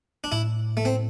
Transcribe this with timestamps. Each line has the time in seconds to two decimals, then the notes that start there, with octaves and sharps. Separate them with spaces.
0.24 D4
0.32 A2 E4
0.77 A3
0.85 C4